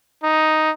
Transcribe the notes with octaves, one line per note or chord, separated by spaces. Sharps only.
D#4